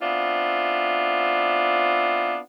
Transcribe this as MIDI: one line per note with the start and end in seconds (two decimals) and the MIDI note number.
0.01 2.38 59
0.01 2.38 60
0.01 2.38 62
0.01 2.38 64
0.01 2.38 65